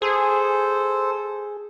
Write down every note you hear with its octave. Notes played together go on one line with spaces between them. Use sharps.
G#4 A4 C5